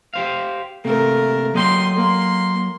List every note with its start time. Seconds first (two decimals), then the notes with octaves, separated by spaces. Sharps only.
0.14 G4 C5 F5
0.85 C3 A3 A#3 A#4
1.54 F#3 A#3 D#5 G5 C6
1.96 A#3 C6